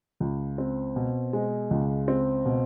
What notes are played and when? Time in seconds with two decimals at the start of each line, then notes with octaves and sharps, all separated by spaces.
0.20 C#2
0.58 C4
0.96 B2
1.33 G#3
1.71 C#2
2.08 C4
2.45 B2